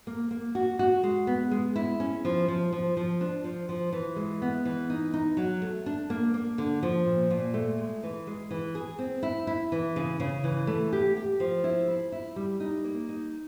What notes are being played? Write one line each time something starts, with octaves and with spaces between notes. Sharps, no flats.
A#3
A#3
F#4
F#4
G#3
B3
G#3
E4
C#4
F3
F3
F3
F3
D4
F3
F3
E3
G#3
B3
E3
D#4
D#4
F#3
A3
D4
A#3
A#3
D3
F3
A#2
A#2
A3
G#3
E3
G#3
E3
G#4
C4
E4
E4
E3
C#3
C#3
E3
A3
G4
G4
F3
E4
E4
E4
G3
D#4
A#3
D#4